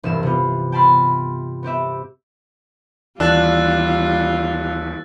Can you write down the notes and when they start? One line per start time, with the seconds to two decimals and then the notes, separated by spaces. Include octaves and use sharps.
0.03 E1 C2 G2 E5 F6 E7
0.23 C3 B3 F4
0.72 G5 A5 B5 C6 F6
1.63 B3 C4 G4 E5
3.20 D#2 E3 G3 D4 F4 E6 F#6 A6